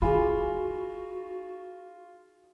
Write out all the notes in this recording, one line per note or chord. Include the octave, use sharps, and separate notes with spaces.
D#4 F4 F#4 G#4 G#5 B5